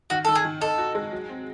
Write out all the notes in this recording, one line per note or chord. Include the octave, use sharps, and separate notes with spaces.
D#3 F#4
D#3 A4
G#4
D#3
D#4 A4
F#4
G#3
F#3
C4